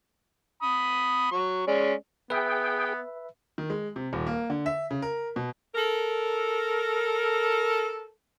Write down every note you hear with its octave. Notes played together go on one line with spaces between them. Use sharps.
B5 D#6
F#3 C#6
G#3 C#4 D5
B3 G#4 B4 E5 G5
D#3
G#3
C3
D#1
A#3
D3
E5
C#3
A#4
B2
A4 A#4